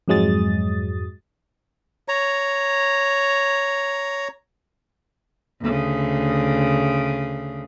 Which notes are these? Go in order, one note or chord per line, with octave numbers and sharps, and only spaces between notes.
F2 G#2 F#3 G#3 D#6 A6
C#5 A#5
D2 C#3